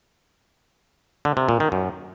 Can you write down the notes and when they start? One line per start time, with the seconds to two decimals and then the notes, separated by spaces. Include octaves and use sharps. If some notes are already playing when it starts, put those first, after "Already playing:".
1.25 D3
1.37 C3
1.49 A#2
1.60 D#3
1.72 F#2